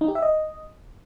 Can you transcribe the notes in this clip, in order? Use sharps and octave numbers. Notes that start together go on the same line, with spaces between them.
D#4
G4
E5
D#5